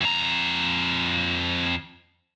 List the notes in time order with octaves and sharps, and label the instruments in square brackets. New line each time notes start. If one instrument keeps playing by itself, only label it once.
[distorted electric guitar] F2 A#5